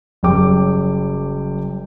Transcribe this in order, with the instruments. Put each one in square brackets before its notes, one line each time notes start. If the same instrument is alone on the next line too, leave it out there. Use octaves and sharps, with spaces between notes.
[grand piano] F#1 F#2 G3 G5 D6